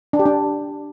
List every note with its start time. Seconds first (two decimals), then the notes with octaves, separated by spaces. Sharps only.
0.13 D4
0.19 G4
0.26 D4